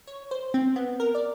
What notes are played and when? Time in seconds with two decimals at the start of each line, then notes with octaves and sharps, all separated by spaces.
0.07 C#5
0.31 C5
0.54 C4
0.76 B3
1.00 A#4
1.15 D5